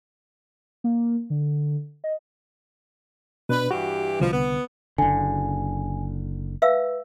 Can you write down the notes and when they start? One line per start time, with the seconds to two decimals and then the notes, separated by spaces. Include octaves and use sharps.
0.84 A#3
1.30 D3
2.04 D#5
3.49 B2 D4 B4
3.71 G2 E3 F#4 G4
4.20 C2 B2 D3 F3
4.31 B3
4.98 F#1 D3 G#5
6.62 B4 E5 F5 E6